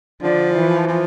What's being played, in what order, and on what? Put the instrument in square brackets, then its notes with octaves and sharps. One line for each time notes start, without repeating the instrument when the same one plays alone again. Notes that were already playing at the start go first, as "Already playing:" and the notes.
[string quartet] D3 [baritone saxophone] F3
[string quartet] E3
[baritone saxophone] F3